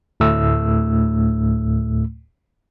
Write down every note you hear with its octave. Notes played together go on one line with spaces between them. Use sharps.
D2 A2 A3 E6